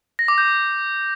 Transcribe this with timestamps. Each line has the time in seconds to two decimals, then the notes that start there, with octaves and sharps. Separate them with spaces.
0.19 A#6
0.28 D6
0.38 G6